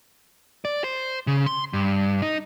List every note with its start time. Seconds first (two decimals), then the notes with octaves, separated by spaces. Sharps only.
0.65 D5
0.84 C5
1.27 C#3
1.46 C6
1.73 G2
2.22 D#4